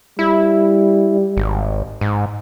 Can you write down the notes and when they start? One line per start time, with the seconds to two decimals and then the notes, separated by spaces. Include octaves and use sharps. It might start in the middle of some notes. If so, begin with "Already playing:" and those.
0.19 G3 E4
1.37 G#1
2.01 G#2